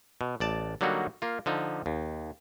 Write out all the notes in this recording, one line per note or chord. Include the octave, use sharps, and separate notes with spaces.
B2
A1 D5 A5
D3 F#3 G3 A#3 D#4 F#4
A#3 F4
D3 F3 D#4
D#2